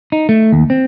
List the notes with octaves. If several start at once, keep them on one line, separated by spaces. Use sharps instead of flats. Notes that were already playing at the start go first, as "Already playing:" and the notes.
D#4
A3
D#2
C4